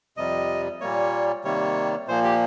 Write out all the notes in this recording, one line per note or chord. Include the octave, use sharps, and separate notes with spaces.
F2 C3 G3 D#5
A#2 G3 A#3 C#5
C3 D#3 G3 A#3 C#5
A#2 F3 A#3 C5
G4